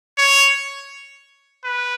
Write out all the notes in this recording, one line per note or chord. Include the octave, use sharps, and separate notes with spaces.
C#5
B4